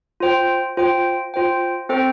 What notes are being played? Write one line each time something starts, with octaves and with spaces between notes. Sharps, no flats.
F4 C5 G5
F4 C5 G5
F4 C5 G5
C4 A4 C5 G5